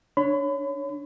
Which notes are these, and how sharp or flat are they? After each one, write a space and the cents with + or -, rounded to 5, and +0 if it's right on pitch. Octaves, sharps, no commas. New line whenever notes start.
D4 +0 C#5 +0 B5 +35